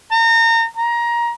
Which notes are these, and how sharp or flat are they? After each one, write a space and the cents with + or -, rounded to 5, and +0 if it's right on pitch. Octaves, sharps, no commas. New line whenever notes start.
A#5 -30
A#5 +20